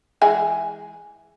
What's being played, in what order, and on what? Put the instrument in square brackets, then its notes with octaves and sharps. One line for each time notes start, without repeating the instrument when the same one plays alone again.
[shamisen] E3 G#3 G#5